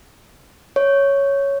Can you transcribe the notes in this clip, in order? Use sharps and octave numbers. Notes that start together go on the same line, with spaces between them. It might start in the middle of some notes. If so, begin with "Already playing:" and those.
C#5